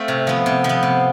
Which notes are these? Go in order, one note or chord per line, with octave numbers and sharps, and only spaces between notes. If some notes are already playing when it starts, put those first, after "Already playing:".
Already playing: A3 C4 F5
C3
F3 B3
C3
F3
B3
C3